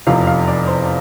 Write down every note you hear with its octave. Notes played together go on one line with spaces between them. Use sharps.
F1 E2 C3 F3 F5
F5
D5
C5